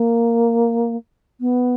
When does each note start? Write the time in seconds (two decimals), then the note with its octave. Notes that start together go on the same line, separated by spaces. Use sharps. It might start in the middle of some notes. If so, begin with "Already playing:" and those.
Already playing: A#3
1.40 B3